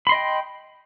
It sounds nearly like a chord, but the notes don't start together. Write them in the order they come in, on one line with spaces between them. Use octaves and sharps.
B5 C6 D#5 G5